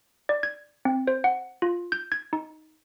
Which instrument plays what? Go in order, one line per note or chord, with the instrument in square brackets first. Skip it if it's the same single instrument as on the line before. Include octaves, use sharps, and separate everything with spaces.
[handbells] D5
G#6
C4
C5
F#5
F4
G6
G#6
D#4